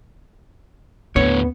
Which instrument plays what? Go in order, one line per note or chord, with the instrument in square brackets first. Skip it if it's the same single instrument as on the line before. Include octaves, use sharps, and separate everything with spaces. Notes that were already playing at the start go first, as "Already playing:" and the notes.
[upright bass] D#2 E4 [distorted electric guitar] A2 D3 [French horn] B3 [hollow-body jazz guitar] C#5